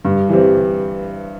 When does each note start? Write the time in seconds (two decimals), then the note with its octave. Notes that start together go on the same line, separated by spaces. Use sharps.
0.05 G2
0.29 E3 G3 C4